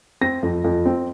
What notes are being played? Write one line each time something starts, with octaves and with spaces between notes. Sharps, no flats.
C4 A#6
F2
F2
C4